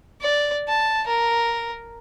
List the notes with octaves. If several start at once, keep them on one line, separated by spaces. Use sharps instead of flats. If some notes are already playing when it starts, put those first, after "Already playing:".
D5
A5
A#4